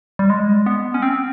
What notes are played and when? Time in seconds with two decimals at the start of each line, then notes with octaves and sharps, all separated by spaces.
0.19 G3
0.30 G#3
0.66 B3
0.94 C#4
1.02 C4